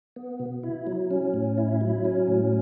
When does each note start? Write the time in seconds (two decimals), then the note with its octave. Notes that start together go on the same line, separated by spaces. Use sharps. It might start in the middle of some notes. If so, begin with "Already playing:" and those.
0.16 B3
0.40 B2
0.63 E4
0.87 F#3
1.11 C#4
1.34 A2
1.58 E4
1.81 F#3
2.05 C#4
2.28 A2